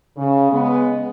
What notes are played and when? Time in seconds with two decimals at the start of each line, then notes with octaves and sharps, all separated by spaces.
0.17 C#3
0.52 G#3 B3